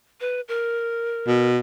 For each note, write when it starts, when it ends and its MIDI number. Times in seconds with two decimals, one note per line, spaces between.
0.21 0.41 71
0.48 1.48 70
1.27 1.59 47